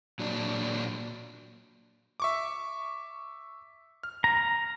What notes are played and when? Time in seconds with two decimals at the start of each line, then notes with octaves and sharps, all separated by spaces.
0.19 A#2 F#3 D4
2.20 E5 C#6 D6
4.03 F6
4.24 A#5